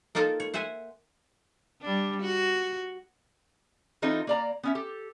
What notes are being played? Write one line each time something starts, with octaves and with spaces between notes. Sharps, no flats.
A#3 D#4 F4 A4 A#4
C#5
C5 E5 F#5 G#5
G3 D4
F#4
E3 C4 D#4 F4 A4
A#3 D5 A#5
B3 C#4 E5
G4 A4